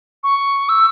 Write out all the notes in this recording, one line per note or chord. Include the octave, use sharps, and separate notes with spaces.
C#6
E6